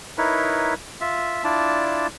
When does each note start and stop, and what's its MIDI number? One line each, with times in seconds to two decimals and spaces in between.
0.18 0.74 63
0.18 0.74 64
0.18 0.74 70
0.18 0.74 71
0.18 0.74 73
1.01 1.44 65
1.01 1.44 76
1.44 2.07 62
1.44 2.07 64
1.44 2.07 65
1.44 2.07 74
1.44 2.07 81